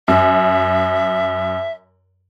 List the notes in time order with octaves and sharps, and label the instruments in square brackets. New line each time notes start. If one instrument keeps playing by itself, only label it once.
[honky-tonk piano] F#2 [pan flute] E5